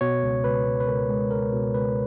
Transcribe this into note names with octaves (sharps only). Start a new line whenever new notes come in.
B2 C#5
C#2
C#2 B4
C#2
B4
C#2 A#4
G#3
C#2 A#4
B2
C#2 B4